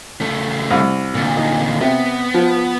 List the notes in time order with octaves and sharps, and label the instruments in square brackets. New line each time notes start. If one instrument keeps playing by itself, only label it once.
[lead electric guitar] C#3 A3
[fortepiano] C2
[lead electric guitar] D2 A#2
[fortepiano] D#4
[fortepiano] C3 [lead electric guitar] B3
[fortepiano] F3